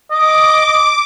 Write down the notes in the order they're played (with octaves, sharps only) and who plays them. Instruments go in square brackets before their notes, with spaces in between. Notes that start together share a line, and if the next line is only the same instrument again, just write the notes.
[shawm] D#5 [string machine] D6